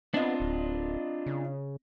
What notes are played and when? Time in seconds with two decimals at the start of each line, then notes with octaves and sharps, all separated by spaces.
0.14 B3 C4 D4 F4 D#5
0.40 D1
1.26 C#3